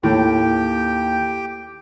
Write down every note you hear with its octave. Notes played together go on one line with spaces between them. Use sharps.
D#2 A2 G4 G5